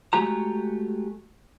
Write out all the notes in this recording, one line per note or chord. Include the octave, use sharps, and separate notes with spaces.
G#3 A3 F#4 G4 A#5